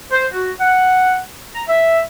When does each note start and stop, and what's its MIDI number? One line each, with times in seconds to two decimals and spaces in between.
0.11 0.25 72
0.33 0.50 66
0.59 1.19 78
1.54 1.62 82
1.67 2.00 76